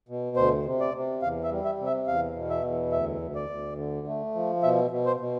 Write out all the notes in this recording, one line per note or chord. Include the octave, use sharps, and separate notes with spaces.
B2
D2 C5
C3
D5
C3
E2 F5
E5
G3
E5
C3
E5
E2 F5
B2
E5
E2
D2 E5
D2
D5
D2
D3
A3
F3
B2 E5
B2
C5
B2